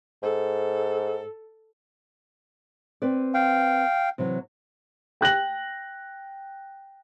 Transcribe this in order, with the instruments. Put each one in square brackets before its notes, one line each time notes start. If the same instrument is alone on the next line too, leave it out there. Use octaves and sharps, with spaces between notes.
[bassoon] G#2 [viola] A4
[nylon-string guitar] C4 B4 D5
[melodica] F5 G5
[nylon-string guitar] C3 E3 F#3
[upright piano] G5 F#6 A#6 F#7